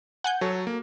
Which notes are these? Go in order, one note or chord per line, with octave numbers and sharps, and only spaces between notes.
F#5 G#5 G6
F#3 A4 C#5
A#3